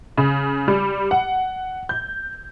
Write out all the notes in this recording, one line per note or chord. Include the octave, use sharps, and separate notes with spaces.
C#3
G3
F#5
G6